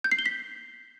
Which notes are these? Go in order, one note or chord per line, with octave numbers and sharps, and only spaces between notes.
G6
C7
G7
B6